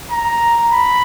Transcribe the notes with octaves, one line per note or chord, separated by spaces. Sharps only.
A#5
B5